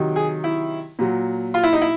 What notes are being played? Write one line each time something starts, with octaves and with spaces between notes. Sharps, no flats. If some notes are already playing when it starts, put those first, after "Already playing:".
Already playing: C3 D#3 F#3
G#4
E4
A#2 F#3
F4
E4
D#4
E4